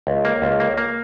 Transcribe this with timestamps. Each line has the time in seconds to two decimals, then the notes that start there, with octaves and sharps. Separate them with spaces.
0.07 C#2
0.25 A#3
0.42 C#2
0.60 A#3
0.77 A#3